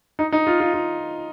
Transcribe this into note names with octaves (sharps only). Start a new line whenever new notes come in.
D#4
D#4
F4
F4
F4